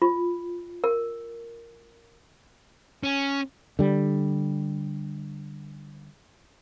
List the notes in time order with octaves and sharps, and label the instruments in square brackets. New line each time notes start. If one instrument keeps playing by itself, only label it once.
[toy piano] F4
A#4
[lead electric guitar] C#4
[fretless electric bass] D3 G3